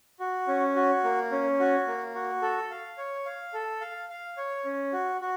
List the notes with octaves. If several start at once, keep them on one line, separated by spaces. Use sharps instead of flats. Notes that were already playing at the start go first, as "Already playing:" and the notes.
F#4
C#4
F#4
A#3
C#4
F#4
A#3
F#4
A4
F5
C#5
F5
A4
F5
F5
C#5
C#4
F#4
F#4